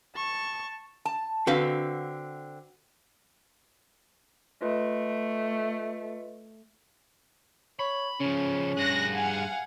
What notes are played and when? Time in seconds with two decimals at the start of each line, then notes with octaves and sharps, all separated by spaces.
0.16 A5 C#6
1.05 A5
1.47 D3 C4 F#4 B4 F5
4.62 A3 F4 B4 D#5
7.79 C#5 B5
8.20 C#3 F3 C#4
8.77 G2 G#4 F#6 A#6
9.13 F5 F#5 G#5